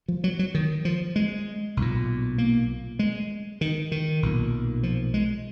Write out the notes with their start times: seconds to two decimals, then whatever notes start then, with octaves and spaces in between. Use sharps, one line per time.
0.08 F3
0.24 F#3
0.39 F#3
0.54 D#3
0.85 F3
1.16 G#3
1.77 B1 A#2
2.38 A#3
2.99 G#3
3.61 D#3
3.92 D#3
4.23 B1 A#2
4.83 F3
5.14 G#3